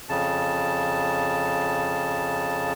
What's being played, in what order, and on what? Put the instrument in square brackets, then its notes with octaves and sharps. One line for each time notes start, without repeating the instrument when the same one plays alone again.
[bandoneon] F2 C#3 A5